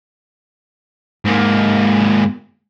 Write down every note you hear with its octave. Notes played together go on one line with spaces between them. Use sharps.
G#2 A#3